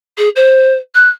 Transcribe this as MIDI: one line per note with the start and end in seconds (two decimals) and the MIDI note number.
0.17 0.29 68
0.35 0.73 72
0.94 1.09 90